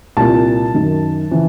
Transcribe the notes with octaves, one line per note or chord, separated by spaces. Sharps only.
C2 A#2 A5
F#2 D#3
C#3 E3